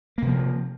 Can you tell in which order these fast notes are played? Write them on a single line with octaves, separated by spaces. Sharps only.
A#3 C3 F3